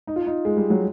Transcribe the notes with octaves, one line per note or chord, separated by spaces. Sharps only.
D#4
F4
D#4
G#3
G3
F#3